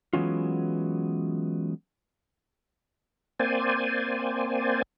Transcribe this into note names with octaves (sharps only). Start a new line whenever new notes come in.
E3 F#3 G#3 B3 C#4 F4
A#3 C4 C5 D5 G#5